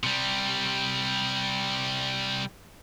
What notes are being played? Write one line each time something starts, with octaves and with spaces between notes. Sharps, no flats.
C3 G3